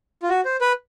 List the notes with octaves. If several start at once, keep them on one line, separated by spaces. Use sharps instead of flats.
F4
F#4
C5
B4